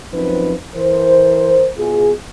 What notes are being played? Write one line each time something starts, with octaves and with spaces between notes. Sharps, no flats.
F#2 F3 C4 D#4 B4
E3 A#4 C5
B2 F4 G#4